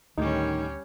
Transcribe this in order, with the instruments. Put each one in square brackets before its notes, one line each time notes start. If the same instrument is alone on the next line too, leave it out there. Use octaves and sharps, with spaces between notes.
[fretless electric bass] D2 [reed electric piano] A2 A3 D#4 [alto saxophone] D#3 [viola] G3 C#4